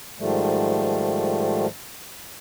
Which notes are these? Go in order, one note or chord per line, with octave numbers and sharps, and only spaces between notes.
G#2 D#3 F3 G3 A3